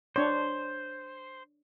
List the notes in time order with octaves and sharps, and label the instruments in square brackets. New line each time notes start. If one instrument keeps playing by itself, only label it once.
[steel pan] D4 C#5 [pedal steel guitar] C5